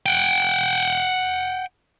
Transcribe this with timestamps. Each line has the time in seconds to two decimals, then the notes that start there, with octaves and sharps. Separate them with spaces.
0.06 F#5 G5